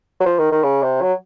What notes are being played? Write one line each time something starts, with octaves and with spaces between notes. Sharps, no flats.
F#3
F3
D#3
D#3
C#3
C3
F#3